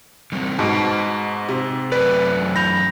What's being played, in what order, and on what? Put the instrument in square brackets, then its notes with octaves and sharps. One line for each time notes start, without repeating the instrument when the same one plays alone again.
[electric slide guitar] D3 G3 C4
[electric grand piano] G#2 [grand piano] B2 [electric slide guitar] D#5 A5
[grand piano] C3
[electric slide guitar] F#2 A3 D5 [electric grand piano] B4
[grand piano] B5 G6 F7 [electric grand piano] A#6